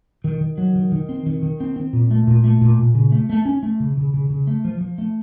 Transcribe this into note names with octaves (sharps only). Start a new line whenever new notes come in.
D#3
D#3
F#3
D#3
D#3
C4
D#3
D#3
C4
C4
A#2
A3
A#2
A3
A#2
A#2
C#3
A3
A3
C#4
A3
C#3
C#3
C#3
C#3
A3
F3
F3
A3